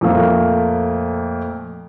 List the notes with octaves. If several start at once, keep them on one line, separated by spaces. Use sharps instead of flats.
F2 A#2 A3 A#3